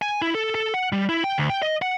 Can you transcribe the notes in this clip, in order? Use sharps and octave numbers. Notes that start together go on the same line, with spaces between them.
G#5
E4
A4
A4
F#5
G3
E4
G5
D2
G5
D#5
F#5